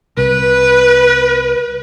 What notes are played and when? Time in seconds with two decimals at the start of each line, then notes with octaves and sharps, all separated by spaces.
0.17 C2 B4